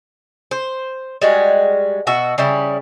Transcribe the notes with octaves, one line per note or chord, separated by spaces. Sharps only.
C5
G3 G#3 F#4
B2 F#4 E5
C#3 G3 E4